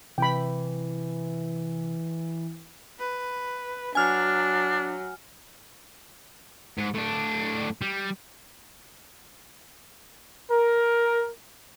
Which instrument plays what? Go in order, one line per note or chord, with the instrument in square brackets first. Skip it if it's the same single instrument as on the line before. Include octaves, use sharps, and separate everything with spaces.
[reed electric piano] C3 [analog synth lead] E3 [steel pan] G5 B5
[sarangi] B4
[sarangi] F#3 [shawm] D4 [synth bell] G#5 F6
[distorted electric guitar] G#2
A2 D4
G3
[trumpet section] A#4